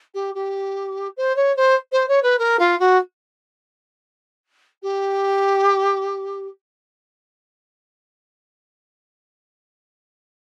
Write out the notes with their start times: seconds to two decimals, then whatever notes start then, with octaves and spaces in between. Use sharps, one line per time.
0.14 G4
0.35 G4
1.17 C5
1.36 C#5
1.56 C5
1.92 C5
2.08 C#5
2.23 B4
2.38 A#4
2.59 F4
2.79 F#4
4.82 G4